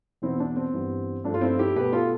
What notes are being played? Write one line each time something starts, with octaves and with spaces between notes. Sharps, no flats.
E2 B2 B3 C4 E4
D4
C4
G2 E3 G3 B3
G2 F3 A3 D4
F4
C4 E4
E4 G4
B2 A3 G4 B4
F4 A4